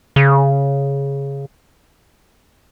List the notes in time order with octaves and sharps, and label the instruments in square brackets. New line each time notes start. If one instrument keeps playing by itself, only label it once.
[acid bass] C#3